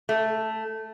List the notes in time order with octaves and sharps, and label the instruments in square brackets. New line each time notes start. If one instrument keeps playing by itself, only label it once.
[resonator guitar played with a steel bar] A3